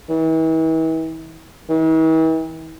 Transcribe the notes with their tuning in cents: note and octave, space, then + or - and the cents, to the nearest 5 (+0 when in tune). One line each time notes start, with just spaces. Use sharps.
E3 -40
E3 -45